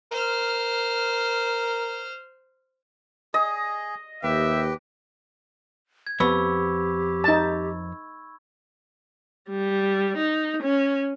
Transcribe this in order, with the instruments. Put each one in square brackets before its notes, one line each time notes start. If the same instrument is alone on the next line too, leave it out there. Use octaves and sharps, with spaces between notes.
[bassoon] A#4 [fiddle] C5 F6
[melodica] G#4 [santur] D#5
[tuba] D#2 [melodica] G4 B4 G5 [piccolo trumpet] E5
[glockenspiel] G#6
[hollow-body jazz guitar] F2 B3 [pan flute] G4 [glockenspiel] B5 C#6 E6
[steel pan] D#4 A5
[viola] G3
D#4
C#4